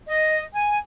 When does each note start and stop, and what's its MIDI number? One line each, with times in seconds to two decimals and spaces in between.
0.07 0.43 75
0.53 0.78 80